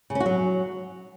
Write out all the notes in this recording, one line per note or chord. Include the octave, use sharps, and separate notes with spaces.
C#3
C#4
F#4
F#3